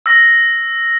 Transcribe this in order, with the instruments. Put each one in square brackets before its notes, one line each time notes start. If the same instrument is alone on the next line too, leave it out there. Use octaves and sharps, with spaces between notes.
[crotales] E6 A#6